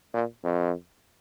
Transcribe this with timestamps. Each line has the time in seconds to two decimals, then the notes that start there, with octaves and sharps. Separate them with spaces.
0.14 A#2
0.44 F2